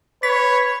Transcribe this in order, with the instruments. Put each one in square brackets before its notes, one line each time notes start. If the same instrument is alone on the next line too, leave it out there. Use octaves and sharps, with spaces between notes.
[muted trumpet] B4 [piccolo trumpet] C#5 [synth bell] B6